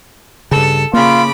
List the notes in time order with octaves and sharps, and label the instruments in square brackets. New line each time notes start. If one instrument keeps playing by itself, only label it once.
[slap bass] G2 C#3 [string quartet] A4
[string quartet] C#3 B5 D6 [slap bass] A#3 [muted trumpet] F4